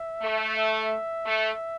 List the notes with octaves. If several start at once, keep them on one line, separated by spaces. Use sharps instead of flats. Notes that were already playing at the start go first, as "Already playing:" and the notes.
Already playing: E5
A3
E5
A3